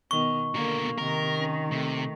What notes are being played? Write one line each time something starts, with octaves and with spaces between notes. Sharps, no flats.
B2 D#3 B3 C#6
B2 D3 A#3 A#4
C3 D#3 A#4
C#4
C3 A3